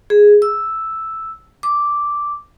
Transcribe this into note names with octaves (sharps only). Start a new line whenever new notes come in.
G#4
E6
D6